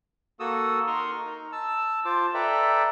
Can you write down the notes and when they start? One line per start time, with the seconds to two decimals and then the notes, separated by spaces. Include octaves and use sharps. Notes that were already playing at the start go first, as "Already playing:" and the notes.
0.40 A#3 F#4 A4 D#6 E6
0.87 D#4 A#4 C6 C#6 D#6 F6
1.25 D#4
1.52 A5 E6
2.05 F4 C5 A5 D6
2.34 A4 B4 D5 E5 G5 A#5